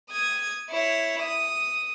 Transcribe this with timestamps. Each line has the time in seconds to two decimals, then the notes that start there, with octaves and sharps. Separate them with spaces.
0.10 D#6 G#6
0.70 E4 C#5
1.22 D#6